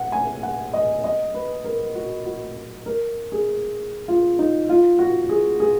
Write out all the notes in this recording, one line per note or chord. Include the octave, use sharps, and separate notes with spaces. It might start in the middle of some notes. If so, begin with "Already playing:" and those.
Already playing: F#5
G#5
F#5
D#5
D#5
B4
A#4
F#4
F#4
A#4
G#4
F4
D#4
F4
F#4
G#4
G#4